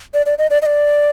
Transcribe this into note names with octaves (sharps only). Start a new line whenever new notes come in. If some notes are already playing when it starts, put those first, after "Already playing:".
D5
D5
D#5
D5
D#5
D5